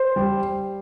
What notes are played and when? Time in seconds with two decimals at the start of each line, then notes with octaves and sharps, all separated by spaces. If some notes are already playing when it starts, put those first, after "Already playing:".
Already playing: C5
0.16 G3